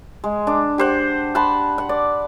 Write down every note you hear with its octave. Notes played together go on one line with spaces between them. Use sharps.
G#3
D4
G4 C5 F#5
F#5 A5 B5 C6
F#5
D5